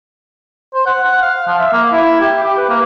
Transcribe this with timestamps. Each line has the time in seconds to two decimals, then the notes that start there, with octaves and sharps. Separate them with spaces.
0.74 C5
0.86 F#5
1.05 F#5
1.22 F5
1.47 F3
1.59 E5
1.73 A#3
1.92 E4
2.21 G4
2.43 G4
2.57 B4
2.69 A#3